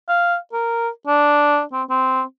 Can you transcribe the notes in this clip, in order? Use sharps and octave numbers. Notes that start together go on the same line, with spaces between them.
F5
A#4
D4
C4
C4